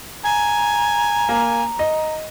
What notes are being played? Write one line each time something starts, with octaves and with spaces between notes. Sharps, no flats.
G#5 A#5
A#3
D#5